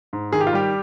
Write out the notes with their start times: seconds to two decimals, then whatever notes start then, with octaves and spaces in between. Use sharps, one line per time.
0.13 G#2
0.32 D#3 G#4
0.41 G4
0.47 F4
0.53 G3 G4